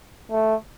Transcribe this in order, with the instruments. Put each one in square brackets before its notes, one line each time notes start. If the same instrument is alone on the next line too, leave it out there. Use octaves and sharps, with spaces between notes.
[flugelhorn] A3